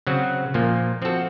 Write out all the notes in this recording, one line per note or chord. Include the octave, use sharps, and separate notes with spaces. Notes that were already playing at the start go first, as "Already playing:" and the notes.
C#3 F#3 C4 F#4
A#2 F3 A#3
F3 C4 F#4 A4